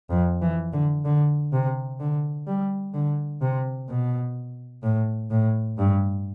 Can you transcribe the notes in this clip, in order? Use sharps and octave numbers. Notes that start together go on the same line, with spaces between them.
F2
E3
D3
D3
C3
D3
G3
D3
C3
B2
A2
A2
G2